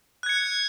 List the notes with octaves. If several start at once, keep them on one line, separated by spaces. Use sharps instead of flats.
F#6 G#6 C#7